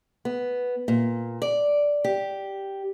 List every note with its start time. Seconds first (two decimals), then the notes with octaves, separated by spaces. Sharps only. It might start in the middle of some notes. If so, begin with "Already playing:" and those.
0.25 B3
0.88 A#2
1.42 D5
2.04 G4